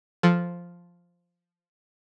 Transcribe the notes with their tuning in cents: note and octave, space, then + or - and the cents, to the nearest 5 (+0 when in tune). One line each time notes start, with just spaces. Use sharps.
F3 +0 A4 +0